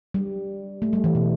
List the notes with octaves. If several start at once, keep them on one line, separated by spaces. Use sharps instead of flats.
G3
A3
G3
E3
B2